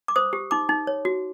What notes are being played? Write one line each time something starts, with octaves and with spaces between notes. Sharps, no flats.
D6
C5 D#6
G4
D#4 D6
D#4
C#5
F#4